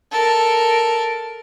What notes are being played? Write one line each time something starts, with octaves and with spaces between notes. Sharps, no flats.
A4 A#4